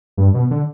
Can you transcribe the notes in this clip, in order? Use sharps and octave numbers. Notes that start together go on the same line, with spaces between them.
G2
B2
D3